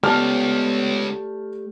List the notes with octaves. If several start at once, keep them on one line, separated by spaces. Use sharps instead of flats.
C#2 A3 B3 G4 D5 A5 F6